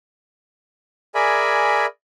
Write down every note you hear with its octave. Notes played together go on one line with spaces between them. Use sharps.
G#4 A#4 D5 E5 G#5 B5